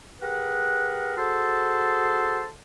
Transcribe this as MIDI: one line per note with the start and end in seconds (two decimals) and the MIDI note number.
0.21 1.16 67
0.21 1.16 68
0.21 1.16 70
0.21 1.16 71
0.21 1.16 78
1.17 2.47 66
1.17 2.47 68
1.17 2.47 69
1.17 2.47 72
1.17 2.47 81
1.17 2.47 84